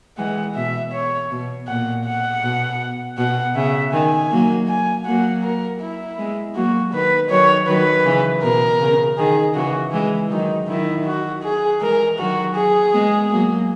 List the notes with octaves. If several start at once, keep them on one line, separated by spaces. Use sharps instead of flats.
E3 G#3 F#5
B2 E5
C#5
B2
A#2 F#5
F#5
B2
B2 F#5
C#3 E5
D#3 G#5
F#3 A#3
G#5
F#3 A#3 F#5
A#4
E4
G#3 B3
F#3 A#3 F#4
D#3 B4
D#3 F#3 C#5
D#3 F#3 B4
C#3 E3
B2 A#4
C#3
D#3 G#4
C#3 E3 F#4
E3 G#3 E4
D#3 F#3 D#4
D#3 F#3 E4
F#4
G#4
E3 G#3 A#4
D#3 F#3 F#4
G#4
G#3 B3
F#3 A#3